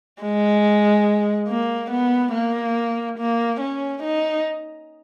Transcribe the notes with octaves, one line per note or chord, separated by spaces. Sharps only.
G#3
A#3
B3
A#3
A#3
C#4
D#4